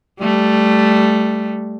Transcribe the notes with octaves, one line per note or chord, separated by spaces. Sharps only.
G3 A3